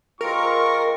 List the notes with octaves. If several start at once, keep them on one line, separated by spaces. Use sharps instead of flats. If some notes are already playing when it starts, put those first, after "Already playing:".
G#3 C4 F4 A#4 C#6